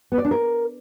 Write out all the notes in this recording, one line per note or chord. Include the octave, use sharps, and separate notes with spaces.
B3
D5
D4
A#4